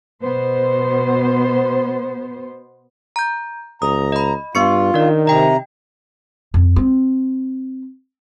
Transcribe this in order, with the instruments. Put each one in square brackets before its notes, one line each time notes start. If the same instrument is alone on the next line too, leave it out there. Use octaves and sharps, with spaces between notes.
[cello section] B2 B3 C5
[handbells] A#5 G6
[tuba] C#2 [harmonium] A#5 [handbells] D#6
[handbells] D#5 B5
[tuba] G2 [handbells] B3 C#6 C#7 [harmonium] F4
[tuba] D#3 [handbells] D4 D5
[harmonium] C3 A#5 [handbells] D#5 G5
[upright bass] F2
C4